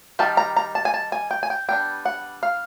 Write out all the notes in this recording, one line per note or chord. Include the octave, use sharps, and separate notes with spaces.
D#3 G3 A5
A#5
A#5
A5
G#5
A5
G#5
G5
G#5
G5
G3 B3 D4 G5
F#5
F5